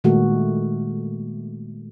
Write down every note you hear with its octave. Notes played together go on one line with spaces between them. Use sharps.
A#2 D#3 G#3 A3 F#4 A4